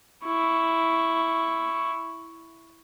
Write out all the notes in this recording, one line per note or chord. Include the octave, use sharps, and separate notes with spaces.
E4 C#6